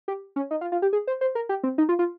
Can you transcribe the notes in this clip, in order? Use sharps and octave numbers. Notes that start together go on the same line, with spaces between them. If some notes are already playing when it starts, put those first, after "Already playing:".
G4
C#4
D#4
F4
F4
G4
G#4
C5
C5
A#4
G4
C4
D#4
F4
F4